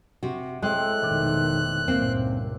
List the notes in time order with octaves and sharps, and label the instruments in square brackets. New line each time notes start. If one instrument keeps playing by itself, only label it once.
[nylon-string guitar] C3 F#4
[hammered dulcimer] A2 C4 [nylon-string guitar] G#3 [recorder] F#6
[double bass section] F1 B2 D#3 [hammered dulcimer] D5
[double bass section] C#2 G2 A#2 [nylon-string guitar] A#3 C4